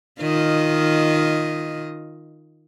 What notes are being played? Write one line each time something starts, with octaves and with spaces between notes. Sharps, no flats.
D#3 F4 D#5